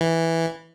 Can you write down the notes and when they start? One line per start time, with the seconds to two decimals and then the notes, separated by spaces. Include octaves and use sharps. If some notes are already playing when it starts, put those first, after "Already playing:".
0.01 E3